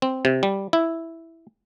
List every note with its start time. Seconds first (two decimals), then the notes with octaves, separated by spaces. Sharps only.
0.02 C4
0.25 C3
0.43 G3
0.73 E4